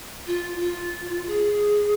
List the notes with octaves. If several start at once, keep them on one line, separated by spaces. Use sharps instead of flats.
F4
F4
G#4